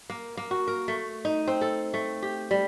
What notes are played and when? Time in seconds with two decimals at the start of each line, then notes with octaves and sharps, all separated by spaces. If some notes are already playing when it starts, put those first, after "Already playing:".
0.10 A#3
0.37 A#3
0.51 F#4
0.68 A#4
0.88 A3
1.25 D#4
1.48 C4
1.61 A4
1.94 A3
2.22 G4
2.51 G3